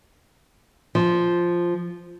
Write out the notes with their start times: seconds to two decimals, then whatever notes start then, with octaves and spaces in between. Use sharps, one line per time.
0.95 F3